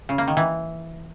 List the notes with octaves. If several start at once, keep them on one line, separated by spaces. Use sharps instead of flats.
C#3
A#3
D#3
E3